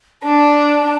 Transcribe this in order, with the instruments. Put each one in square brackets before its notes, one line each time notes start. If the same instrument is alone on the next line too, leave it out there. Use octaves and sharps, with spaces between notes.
[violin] D4 [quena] A5